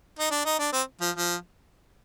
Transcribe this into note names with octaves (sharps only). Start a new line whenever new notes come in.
D#4
D4
D#4
D4
C4
F3
F3